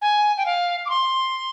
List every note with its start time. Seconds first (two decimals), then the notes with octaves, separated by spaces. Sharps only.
0.02 G#5
0.37 G5
0.46 F5
0.86 D6
0.90 C6